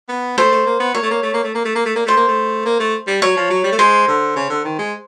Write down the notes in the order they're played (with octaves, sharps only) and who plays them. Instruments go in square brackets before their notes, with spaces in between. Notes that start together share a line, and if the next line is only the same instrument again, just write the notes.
[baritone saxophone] B3
[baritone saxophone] A3 [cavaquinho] C5
[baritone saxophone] A3
A#3
B3
[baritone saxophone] A#3 [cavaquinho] C#5
[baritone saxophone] A3
A#3
A3
A#3
A3
A#3
A3
A#3
A3
A#3
[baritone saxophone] A3 [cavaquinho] C5
[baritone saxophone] A#3
A3
A#3
A3
G3
[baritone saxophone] F#3 [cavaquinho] C#5
[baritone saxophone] F3
F#3
G3
A3
[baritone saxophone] G#3 [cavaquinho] C5
[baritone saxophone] D3
C#3
D3
D#3
G#3